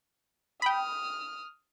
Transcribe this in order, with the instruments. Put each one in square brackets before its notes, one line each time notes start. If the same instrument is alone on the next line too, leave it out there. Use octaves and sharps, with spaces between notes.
[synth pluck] G5 B5 [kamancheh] D#6 F6